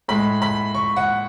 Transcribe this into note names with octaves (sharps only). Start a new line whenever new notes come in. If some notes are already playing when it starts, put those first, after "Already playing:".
A2 G#3 B5
B5
C#6
F#5